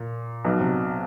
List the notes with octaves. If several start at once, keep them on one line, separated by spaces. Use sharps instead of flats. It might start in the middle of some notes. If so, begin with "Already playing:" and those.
Already playing: A#2
B1 B2
C3